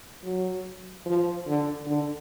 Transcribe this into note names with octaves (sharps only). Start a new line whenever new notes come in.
F#3
F3
D3
D3